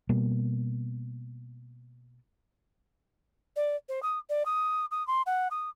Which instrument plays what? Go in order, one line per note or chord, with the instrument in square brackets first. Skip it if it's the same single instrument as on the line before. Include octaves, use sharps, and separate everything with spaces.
[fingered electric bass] B2 G3 A#3 B3
[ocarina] D5
C5
D#6
D5
D#6
D#6
C6
F#5
D#6